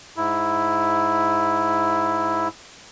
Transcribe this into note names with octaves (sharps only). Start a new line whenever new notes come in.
G#2 E4